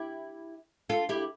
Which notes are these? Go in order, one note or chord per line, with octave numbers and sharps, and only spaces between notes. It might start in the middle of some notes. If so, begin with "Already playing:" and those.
Already playing: E4 G4
F4 A4
E4 G4